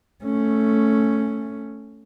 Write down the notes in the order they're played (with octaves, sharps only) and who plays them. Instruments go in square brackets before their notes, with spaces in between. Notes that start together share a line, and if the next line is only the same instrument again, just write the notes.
[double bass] A3 C#4